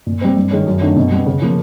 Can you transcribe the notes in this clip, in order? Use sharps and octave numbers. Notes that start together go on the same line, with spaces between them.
A#2
G3 C4
G2
D#3 G#3 C#4
F#2
D#3 F#3 A3 D4
B2
G3 B3
C#3
F3 A#3